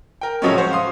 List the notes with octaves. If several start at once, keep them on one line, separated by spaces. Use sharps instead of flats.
A#4 G5
A2 C#3 F3 F#3 G#3 C#4
C#4 F#4 C5 C#5
F5 C6 D#6